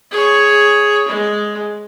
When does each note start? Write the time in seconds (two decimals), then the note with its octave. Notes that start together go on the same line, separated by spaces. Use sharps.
0.11 G#4 C#5
1.08 G#3